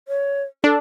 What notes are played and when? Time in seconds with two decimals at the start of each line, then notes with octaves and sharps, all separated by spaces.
0.08 C#5
0.64 D4 A4